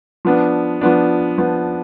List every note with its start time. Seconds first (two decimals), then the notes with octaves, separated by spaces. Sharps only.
0.25 F3 B3 D4
0.81 F3 B3 D4
1.38 F3 B3 D4